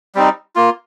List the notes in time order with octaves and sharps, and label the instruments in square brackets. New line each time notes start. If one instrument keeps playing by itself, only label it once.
[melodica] G3 C4 D#4
A#3 F4